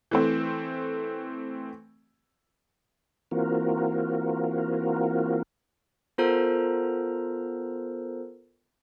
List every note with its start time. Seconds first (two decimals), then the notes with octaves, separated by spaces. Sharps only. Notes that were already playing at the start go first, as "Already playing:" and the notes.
0.11 E3 A3 C4
3.31 E3 A#3 C4 F4 F#4 A#4
6.18 B3 F4 A4 A#4 C5 A#5